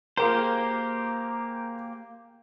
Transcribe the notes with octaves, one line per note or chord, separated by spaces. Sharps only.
A#3 F4 G4 G#4 A#4 C5